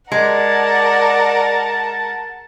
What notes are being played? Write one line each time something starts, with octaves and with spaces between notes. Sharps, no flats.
G#3 A#4 D5 F#5 A5